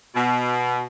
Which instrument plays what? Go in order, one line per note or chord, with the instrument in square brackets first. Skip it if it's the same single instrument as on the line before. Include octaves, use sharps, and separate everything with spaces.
[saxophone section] B2